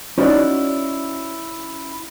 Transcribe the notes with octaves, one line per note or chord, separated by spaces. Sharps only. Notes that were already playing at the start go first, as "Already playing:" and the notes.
C#4 D#4 E4 F#4 D5